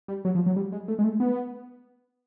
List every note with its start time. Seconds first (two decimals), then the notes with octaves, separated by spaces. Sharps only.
0.08 G3
0.25 F#3
0.35 F3
0.46 F#3
0.56 G3
0.72 G#3
0.88 A3
0.99 G#3
1.04 A3
1.20 B3